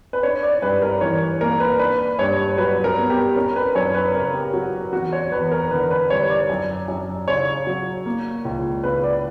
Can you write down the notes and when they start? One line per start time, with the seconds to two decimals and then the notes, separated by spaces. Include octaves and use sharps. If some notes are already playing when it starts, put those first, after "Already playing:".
0.13 B4
0.23 D4 C#5
0.43 D5
0.62 G2 B4
0.82 A#4
1.01 E3 C#5
1.41 A#3 A#4
1.60 B4
1.79 D4 B4
2.19 G2 C#5
2.58 F#3 B4
2.84 A#4
2.97 B3
3.10 G4
3.36 C#4 A#4
3.56 B4
3.75 F#2 C#5
3.95 B4
4.14 C#3 A#4
4.34 G4
4.54 F#3 F#4
4.93 E2 F#4
5.12 C#5
5.32 E2 B4
5.52 A#4
5.71 D3 B4
5.91 B4
6.10 G3 C#5
6.29 D5
6.50 F#2
6.88 F#2
7.28 C#3 C#5
7.67 F#3
8.06 A#3
8.45 C#2
8.84 C#3 B4
9.03 D5